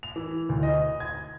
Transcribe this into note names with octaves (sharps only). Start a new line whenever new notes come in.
F7
E3
D2
D#5
G#6